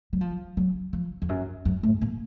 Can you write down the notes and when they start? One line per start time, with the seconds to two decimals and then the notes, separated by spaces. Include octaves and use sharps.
0.13 F#3
0.21 F3
0.57 F#3
0.93 F3
1.22 F2
1.29 F#2
1.65 F#2
1.83 A2
2.01 A#2